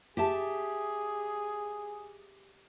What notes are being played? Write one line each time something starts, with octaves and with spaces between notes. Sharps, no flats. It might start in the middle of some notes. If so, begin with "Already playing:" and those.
G4 G#4 E5 A5